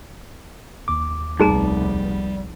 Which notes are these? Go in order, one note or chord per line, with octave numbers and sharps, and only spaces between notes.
D#2 D6
F1 C2 G3 B3 D#4 G#4 A#5